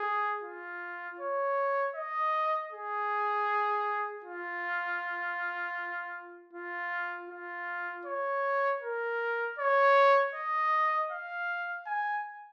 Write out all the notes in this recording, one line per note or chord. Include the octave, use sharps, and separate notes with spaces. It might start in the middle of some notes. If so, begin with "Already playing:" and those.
Already playing: G#4
F4
C#5
D#5
G#4
F4
F4
F4
C#5
A#4
C#5
D#5
F5
G#5